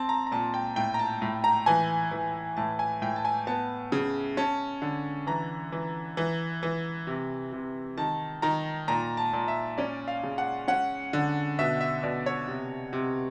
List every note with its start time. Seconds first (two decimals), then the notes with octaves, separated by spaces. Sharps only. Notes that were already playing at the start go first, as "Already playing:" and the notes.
Already playing: C4 A5
0.09 A#5
0.27 A#5
0.32 A#2 A5
0.54 G5
0.76 A2 G5
0.94 A#5
0.99 A5
1.22 A2
1.44 A#5
1.66 E3 G#5
2.11 E3
2.57 A2 A5
2.79 G#5
3.02 A2 G5
3.16 A5
3.25 G#5
3.47 B3 A5
3.92 C#3
4.37 C#4 A5
4.82 D3
5.27 E3 A#5
5.72 E3
6.17 E3
6.63 E3
7.07 C3
7.52 C3
7.97 D#3 A5
8.42 D#3 A#5
8.88 A#2 A#5
9.17 A5
9.33 A#2
9.48 E5
9.78 C#4 D5
10.08 F5
10.23 C#3
10.38 F#5
10.68 C#4 F#5
11.13 D3
11.59 B2 E5
11.81 E5
12.03 B2 D5
12.26 C#5
12.48 C3
12.93 C3